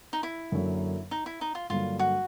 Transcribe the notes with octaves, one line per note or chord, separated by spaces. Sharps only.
D#4
E4
F#2 D3 F#3 A#3
D#4
E4
D#4
F4
G2 D3 F#3 A#3 F4
F#4